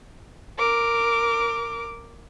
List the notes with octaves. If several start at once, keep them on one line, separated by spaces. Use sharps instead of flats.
A#4 D6